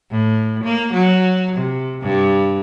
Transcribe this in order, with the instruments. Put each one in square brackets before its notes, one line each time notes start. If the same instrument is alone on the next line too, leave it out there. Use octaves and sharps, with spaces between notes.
[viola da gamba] A2
A#3
F#3
C3
G2